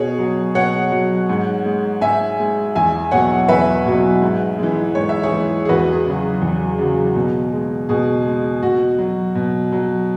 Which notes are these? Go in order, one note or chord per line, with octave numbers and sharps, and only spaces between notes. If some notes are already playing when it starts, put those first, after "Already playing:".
Already playing: B2 G#4 C#5
F#3
B2 C#5 F#5
F#3
G#2
G#3
G#2 E5 G#5
G#3
E2 E5 G#5
B2 F#3 C#5 F#5
E2 B4 E5
B2 F#3
G#2
E3 G#3
G#2 C#5
E5
G#4 C#5
E3 G#3
G#4
E2 F#4 B4
G#4
C#3 F#3
E2
C#3 F#3
B2
G#3
B2 G#4
G#3
B2 F#4
F#3
B2
F#3